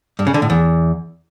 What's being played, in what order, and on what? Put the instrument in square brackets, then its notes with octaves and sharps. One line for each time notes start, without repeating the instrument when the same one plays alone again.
[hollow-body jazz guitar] G2
C#3
D3
A2
E2